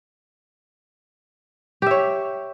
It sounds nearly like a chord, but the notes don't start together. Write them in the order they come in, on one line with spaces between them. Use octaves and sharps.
G4 E5 C#5